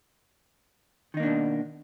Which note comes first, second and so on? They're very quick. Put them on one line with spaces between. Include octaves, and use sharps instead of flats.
D#3 D#4 A#3 D4 B2